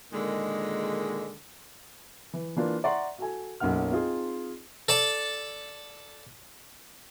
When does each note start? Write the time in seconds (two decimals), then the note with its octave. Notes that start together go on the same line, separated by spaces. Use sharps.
0.12 A#2 D3 D#3 G#3
2.33 E3
2.56 E3 A#3 D4 F4
2.84 D5 E5 F#5 A#5 C6 C#6
3.18 F#4 A4 G#5
3.60 B1 F#2 A#3 F#5 F6
3.91 C4 D#4 F4 G#4
4.88 A4 D5 A5